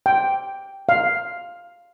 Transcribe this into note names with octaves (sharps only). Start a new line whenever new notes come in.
G5
F5